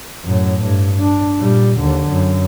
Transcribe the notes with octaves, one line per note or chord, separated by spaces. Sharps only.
F#2 A2
G2
D4
A#2 G3
D#2 D3
F#2